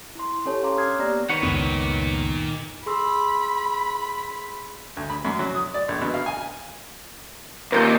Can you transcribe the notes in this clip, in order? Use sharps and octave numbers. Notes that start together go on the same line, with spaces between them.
E4 C6
C#4 G4 A4 C#5 G#5 A5
C#5 F5 G#5 A#5 C6 D6
D4 D#6 F6 F#6 G#6 C7
A#3 B3 G4 D5 A#5 A#6
D#3 B4 C#5 F#5
C#2 F#2 A#2 B3
G#4 B5 C6 E6
D2
B5
F#2
F#3
D#6
D5
A#1
B2
F5
G#5
D#2 A#2 A#4 G6